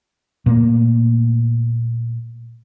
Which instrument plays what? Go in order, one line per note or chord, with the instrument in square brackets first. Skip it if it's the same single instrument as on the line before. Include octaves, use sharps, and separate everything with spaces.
[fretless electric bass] A#2 A3 A#3